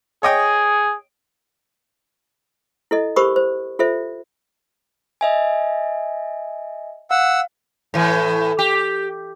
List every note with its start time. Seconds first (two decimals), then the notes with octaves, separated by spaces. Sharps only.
0.23 G#4 C#5 D#5 G5
2.91 E4 A4 D#5
3.16 G4 A#4 C5 B5 C#6 D#6
3.36 C5
3.79 F4 A4 C5 E5
5.21 D#5 E5 G#5
7.11 F5 F#5 E6
7.94 A2 E3
8.59 G4